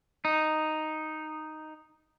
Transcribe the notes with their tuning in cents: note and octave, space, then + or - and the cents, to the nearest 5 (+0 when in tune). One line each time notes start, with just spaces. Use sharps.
D#4 -5